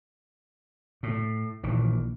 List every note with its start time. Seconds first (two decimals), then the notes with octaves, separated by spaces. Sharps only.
1.03 A2
1.64 A#1 A#2 D#3 E3